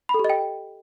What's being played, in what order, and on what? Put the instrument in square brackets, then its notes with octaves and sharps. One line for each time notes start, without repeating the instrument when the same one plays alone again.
[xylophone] B5
A4
G4
D#5
G5